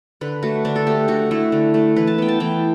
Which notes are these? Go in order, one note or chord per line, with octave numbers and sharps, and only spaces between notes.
D3 B4
A3 F#4
D3 D4
A4
A3 G4
D3 F#4
A3 E4
D3
A3
E3 B4
A5
B3 G5
A5
E3 G5